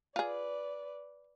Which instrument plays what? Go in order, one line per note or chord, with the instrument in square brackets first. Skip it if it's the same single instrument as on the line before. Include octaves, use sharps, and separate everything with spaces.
[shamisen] F4 G#4 [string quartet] B4 D5